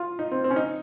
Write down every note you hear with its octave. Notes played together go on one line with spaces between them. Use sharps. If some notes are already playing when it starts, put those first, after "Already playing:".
Already playing: F4
D#4
C4
C4
C#4
D#4